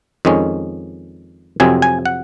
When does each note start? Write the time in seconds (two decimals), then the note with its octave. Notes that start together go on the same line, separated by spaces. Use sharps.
0.25 F2 D#3 G#3 C#4
1.60 F2 C3 F#3 C4 G#5
1.82 G#5
2.06 F#5